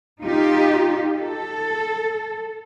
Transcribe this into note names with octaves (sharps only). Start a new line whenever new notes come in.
D#4 F4 G4
A4